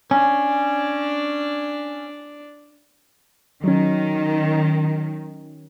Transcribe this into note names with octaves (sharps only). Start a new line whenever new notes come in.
C#4 D4
D#3 F#3 C#4